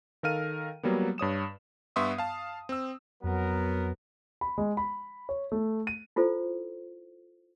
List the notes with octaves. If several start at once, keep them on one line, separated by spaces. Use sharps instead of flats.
D#3 A4 A#4 F5 F6 D#7
F#3 G3 A#3 B3
G2 C#5 D#6 E7
G2 B3 E5 C6 C#6 D#6
F5 A5
C4 E6
F2 F#3 B3 A#4
B5
G#3
B5
C#5
A3
D#7
E4 F4 A4 C5